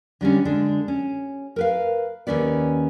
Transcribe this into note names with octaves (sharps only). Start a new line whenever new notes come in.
D3 G3 G#3 C#4
D3 G#3 D4
C#4
A#4 B4 F5
D#2 C#3 C#4 B4 D5